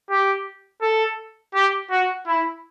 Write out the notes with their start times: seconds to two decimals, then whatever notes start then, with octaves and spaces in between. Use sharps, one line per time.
0.10 G4
0.82 A4
1.55 G4
1.91 F#4
2.27 E4